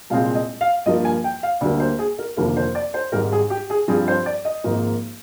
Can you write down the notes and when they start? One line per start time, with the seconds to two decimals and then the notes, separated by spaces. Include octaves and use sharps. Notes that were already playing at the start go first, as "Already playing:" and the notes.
0.10 C2 A#2 G#3 C4 F5
0.35 D#5
0.61 F5
0.86 G2 F3 A#3 D#5
1.05 G#5
1.24 G5
1.43 F5
1.61 D2 D3 G3 A#3 D5
1.80 C5
1.99 G#4
2.18 A#4
2.37 F1 D#2 D3 F3 A#3 A#4
2.57 C5
2.75 D5
2.94 C5
3.12 G#1 G#2 G3 A#4
3.32 G#4
3.50 G4
3.70 G#4
3.88 G2 F3 C4 G#4
4.08 C5
4.26 D5
4.45 D#5
4.64 G#1 G#2 F3 A#3